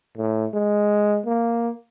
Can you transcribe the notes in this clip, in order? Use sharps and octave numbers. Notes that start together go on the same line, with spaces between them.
A2
G#3
A#3